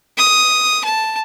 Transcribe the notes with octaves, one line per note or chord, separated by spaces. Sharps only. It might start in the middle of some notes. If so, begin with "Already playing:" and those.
D#6
A5